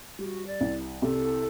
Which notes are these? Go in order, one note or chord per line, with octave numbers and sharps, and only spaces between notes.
G3 G4
F#4
D5
C2
C3 A4